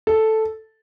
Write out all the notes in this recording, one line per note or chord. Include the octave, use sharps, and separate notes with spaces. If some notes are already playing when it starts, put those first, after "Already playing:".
A4